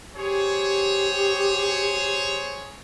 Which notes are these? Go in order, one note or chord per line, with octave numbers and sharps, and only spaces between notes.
G4 G#4 C5 C#5